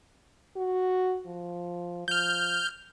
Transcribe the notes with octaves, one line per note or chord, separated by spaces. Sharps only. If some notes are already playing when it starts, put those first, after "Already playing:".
F#4
F3
F3 F6 G6